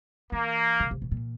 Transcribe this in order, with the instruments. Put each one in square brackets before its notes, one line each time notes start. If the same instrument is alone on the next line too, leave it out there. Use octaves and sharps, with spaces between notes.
[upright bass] E3 [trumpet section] A#3
[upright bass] C#3
C3
B2
A#2